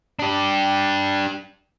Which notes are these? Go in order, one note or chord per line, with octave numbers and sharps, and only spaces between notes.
D4 G4